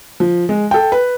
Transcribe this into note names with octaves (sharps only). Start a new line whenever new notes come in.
F3
G#3
A4 G5
B4